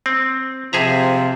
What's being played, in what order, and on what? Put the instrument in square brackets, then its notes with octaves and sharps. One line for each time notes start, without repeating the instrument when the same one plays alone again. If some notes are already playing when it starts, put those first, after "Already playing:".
[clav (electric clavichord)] C4
[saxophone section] C3 F3 [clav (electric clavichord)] G#4 E5 A#5